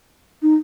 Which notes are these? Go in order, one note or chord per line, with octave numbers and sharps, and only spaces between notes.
D#4